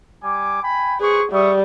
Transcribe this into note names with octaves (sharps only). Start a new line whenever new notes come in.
G3 G#5 D6
G5 G#5 B5
G#4 B4 C5 C#6
G3 E5 C#6 D#6